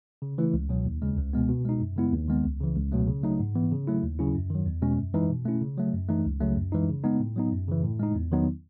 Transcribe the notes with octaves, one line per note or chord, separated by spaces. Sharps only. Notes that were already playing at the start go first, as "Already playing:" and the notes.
C#3
E3 A3 E4
C#2
B2 F#3
D#2
C#3 G#3
C#2
B2 G#3 B3
B2
G#3 D#4
F#2
C#3 G#3 B3 E4
D#2
D#3 G#3 B3
C#2
C#3 E3
C#2
B2 F#3 A3
C#3
F#3 A3 D#4
G#2
E3 B3
C#3
F#3 A3 E4
D#2
C#3 F#3 C#4 E4
F#2
D#3 F#3
E2
B2 G#3 C#4
F#2
E3 G#3 D#4
B2
A3 C#4 E4
C#3
F#3 A3
F#2
E3 A3 D#4
C#2
C#3 F#3 A3
F#2
E3 G#3 D#4
C#3
G#3 B3 D#4
A2
F#3 B3 D#4
F#2
C#3 E3
A2
G#3 D#4
E2
D#3 F#3 B3 D#4